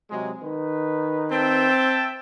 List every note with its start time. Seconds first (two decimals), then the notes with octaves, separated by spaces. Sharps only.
0.10 C3 F#3 G#3
0.42 D#3 D#4 B4
1.31 C4 E5 G5 A5